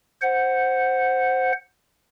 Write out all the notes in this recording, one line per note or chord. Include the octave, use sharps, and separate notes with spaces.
C5 F#5